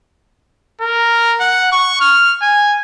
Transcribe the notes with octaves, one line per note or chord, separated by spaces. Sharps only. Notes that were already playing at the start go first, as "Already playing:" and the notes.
A#4
F#5
C#6
F6
G#5